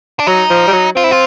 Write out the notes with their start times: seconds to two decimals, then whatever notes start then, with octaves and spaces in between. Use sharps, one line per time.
0.19 D4
0.27 F#3 D#4
0.50 F3
0.67 G3
0.73 F#3
0.96 C4 F4
1.04 E4
1.11 F4